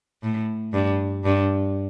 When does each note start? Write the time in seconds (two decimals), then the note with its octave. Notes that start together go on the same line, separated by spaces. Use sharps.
0.23 A2
0.73 G2
1.24 G2